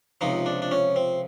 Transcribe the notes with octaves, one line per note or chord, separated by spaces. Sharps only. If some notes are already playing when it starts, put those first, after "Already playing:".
C#2 C3 F3 D#4
D4
D4
C#4
C4